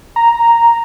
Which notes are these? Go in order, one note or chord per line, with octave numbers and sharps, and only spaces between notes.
A#5